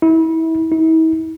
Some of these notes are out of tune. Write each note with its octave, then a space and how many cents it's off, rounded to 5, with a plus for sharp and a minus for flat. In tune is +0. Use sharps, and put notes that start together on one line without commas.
E4 -30
E4 -45